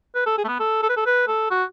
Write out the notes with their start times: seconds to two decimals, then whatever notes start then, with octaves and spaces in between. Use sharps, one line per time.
0.15 B4
0.26 A4
0.38 G#4
0.44 A3
0.48 B3
0.60 A4
0.83 A4
0.89 B4
0.97 A4
1.06 B4
1.28 A4
1.50 F#4